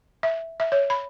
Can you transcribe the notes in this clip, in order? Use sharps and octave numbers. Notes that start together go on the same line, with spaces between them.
E5
E5
C#5
B5